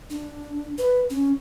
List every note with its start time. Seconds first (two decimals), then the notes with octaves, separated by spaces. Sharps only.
0.10 D4
0.78 B4
1.10 C#4